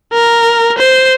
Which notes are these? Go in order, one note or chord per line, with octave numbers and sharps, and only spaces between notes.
A#4
C5